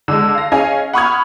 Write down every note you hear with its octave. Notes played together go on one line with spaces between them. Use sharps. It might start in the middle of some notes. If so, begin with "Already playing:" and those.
D3 G#3
F5 A#6
C#4 G#4 D#5 F5 G#5
F#5 B5 C#6 D#6 F6 G#6